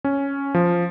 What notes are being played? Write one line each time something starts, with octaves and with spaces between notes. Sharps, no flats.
C#4
F3